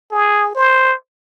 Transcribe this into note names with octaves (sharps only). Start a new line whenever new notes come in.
G#4
C5